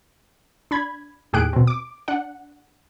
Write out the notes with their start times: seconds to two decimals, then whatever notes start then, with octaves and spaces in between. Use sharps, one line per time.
0.71 D4 B5 G#6
1.33 D#2 A2 G4 G#4 F#6 D7
1.53 B2 C4
1.67 D6
2.08 D4 F#5